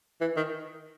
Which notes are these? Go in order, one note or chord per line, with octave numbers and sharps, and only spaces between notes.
E3
D#3